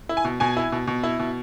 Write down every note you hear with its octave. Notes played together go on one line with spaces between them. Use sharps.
E4
G#5
B2
B2 G#5
E4
B2
B2
E4
B2